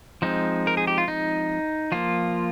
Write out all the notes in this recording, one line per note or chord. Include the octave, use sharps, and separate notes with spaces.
F3 G#3 C4 D#4
A#4
G#4
G4
F4
D#4
F3 A#3 F4